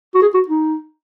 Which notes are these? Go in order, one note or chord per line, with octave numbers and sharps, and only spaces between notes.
F#4
G#4
F#4
D#4